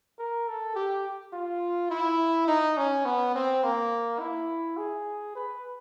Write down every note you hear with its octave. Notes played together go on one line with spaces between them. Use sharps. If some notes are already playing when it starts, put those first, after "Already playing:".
A#4
A4
G4
F4
E4
D#4
C#4
B3
C4
A#3
E4
G#4
B4